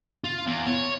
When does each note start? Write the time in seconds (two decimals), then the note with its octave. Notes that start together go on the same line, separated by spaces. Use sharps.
0.24 F4
0.47 E2
0.66 C#5